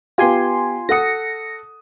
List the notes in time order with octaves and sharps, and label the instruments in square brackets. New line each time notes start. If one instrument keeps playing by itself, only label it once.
[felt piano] B3 G4 [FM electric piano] F4 G#5 C6
[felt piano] A4 F#5 D#6 [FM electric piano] A#6 C#7